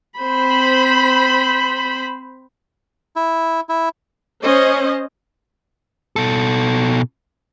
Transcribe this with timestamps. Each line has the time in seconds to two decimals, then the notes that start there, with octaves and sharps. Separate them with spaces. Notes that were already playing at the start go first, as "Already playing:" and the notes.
0.19 C4 C5 B5
3.16 E4
3.69 E4
4.43 C#4 C5 D#5
6.16 B2 A4